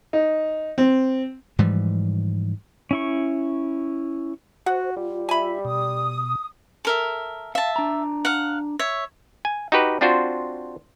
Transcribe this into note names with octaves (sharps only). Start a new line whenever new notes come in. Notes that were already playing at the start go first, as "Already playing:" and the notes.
D#4
C4
G#2 E3 F3 G3
C#4 E4 C#6
F#4 C5 F#5
G3 F4
E5 G#5 B5
B2 D#6
A4 A#4 E5
E5 F5 A5
D4 A#5
F5 F#5
C#5 E5
G#5
D#4 F#4 G4 B4
C4 D4 F4 F#4 C5